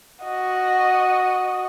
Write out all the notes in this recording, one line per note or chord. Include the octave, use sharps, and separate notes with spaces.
F#4 D#5